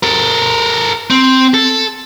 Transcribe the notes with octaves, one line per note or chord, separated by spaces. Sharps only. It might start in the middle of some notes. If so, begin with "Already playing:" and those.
A4 A#4
C4
A4